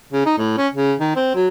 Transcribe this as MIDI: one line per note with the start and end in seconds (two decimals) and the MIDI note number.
0.13 0.24 49
0.26 0.34 63
0.38 0.55 45
0.57 0.67 61
0.73 0.94 49
0.99 1.11 51
1.16 1.31 60
1.35 1.48 54